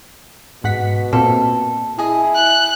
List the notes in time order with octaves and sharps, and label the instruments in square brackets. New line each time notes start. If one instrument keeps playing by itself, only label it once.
[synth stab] G#2 F#5 B6 [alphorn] B2
[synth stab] A#2 A#3 C4 [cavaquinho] A4
[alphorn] E4 [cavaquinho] G#4 D#5
[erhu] F#6